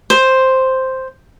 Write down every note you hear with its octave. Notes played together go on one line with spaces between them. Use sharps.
C5